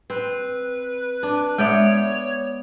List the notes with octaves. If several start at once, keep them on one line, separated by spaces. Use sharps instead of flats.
C4 B4
D4
G#3 B3 C#5 D5 E5 G5